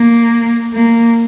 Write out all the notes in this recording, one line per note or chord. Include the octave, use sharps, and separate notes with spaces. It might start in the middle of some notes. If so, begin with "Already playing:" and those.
Already playing: A#3
A#3